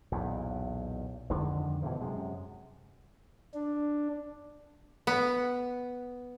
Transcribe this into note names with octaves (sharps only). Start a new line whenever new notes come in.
B1 E2 A#2
F2 D3 D#3 G#3
B2 D3 E3 F3
F#2 C3 G#3
D4
B3